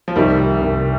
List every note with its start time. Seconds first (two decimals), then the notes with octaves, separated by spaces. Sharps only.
0.08 F3
0.16 C2 D#3 G3
0.62 C2